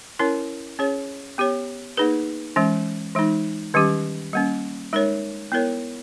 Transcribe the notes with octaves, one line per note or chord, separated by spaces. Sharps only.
C#4 E4 A#4 C#5
C#4 G#4 C#5
B3 G4 C#5
A#3 D#4 G#4 B4
E3 G#3 C#4
E3 G#3 D#4
D#3 G3 C#4 G4
G3 A#3 C#4
G#3 D#4 A#4 C#5
B3 E4 A#4 C#5